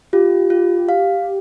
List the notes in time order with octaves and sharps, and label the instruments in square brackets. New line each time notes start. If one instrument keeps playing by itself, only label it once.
[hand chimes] F4 [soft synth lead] G4
[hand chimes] F4
F5